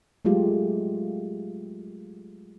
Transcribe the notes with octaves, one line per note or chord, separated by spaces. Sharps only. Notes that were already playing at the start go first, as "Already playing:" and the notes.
F#3 G#3 A3 F4 G4